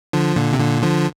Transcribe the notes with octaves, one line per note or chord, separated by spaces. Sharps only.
D3 F3
A#2 D3
C3
A#2 D3
D3 F3